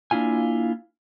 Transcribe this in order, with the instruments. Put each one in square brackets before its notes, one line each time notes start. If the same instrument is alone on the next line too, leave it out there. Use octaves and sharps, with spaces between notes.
[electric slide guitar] A#3 D4 E4 F4 G#5